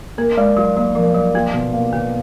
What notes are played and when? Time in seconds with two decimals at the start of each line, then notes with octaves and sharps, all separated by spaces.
0.18 A#3 A#4
0.37 G#3 D5
0.56 F#3 F4
0.77 F#3 A#3
0.95 F3 A#4
1.15 F#3 D5
1.34 A#3 F4
1.54 B2
1.73 A#3
1.92 B2 B3